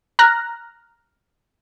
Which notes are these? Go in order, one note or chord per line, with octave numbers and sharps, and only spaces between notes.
A#5 F6 F#6 A#6